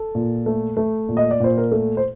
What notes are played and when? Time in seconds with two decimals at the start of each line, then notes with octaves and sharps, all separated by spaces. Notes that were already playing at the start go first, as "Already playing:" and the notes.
Already playing: A4
0.15 A#2
0.46 A3
0.77 A3
1.09 A#2
1.17 D#5
1.31 D5
1.40 A#2 C5
1.57 A#4
1.71 A3 A4
1.97 C5